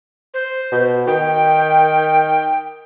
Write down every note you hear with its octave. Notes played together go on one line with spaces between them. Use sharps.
C5
B2
D#3 G5